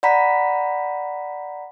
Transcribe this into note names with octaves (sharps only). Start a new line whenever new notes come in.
D5 F#5 A#5 B5 B6